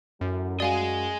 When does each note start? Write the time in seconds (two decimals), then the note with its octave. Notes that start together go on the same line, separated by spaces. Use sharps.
0.21 F#2 A2 F#3
0.60 F#4 G#4 D5 D#5 F5 G#5